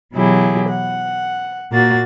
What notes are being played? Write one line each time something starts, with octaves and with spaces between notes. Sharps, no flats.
B2 E3 F#3 E4 G4 G#4
F#5
A#2 A#3 F#4 A6